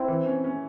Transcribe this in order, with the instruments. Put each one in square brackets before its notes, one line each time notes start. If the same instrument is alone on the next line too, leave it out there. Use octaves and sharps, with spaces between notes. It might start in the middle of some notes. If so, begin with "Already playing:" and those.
Already playing: [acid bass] C4 [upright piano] E4
[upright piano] E3
C#4
C#4